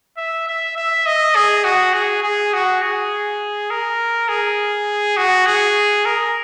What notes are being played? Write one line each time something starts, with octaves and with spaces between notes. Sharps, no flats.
E5
E5
E5
D#5
G#4
F#4
G#4
G#4
F#4
G#4
A#4
G#4
F#4
G#4
A#4